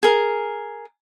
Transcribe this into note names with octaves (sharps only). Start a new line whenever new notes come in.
G#4 A#4